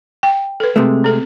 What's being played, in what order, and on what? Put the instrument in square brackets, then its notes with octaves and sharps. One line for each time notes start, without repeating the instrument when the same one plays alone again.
[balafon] G5
A4 B4
[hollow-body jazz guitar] C3 G#3 A3
[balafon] C4 A4